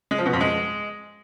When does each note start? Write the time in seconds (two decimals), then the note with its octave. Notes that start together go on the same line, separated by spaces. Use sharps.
0.11 G#3
0.18 F3
0.26 B2
0.33 F2
0.41 G#3